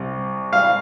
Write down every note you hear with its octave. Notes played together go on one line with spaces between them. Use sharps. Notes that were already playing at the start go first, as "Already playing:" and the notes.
Already playing: C2 C3
F5